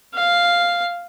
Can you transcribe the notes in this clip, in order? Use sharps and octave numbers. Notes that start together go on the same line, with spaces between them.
F5